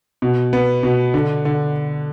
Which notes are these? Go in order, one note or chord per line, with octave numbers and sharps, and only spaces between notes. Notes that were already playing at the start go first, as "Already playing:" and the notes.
B2
B3
B2
D3
D3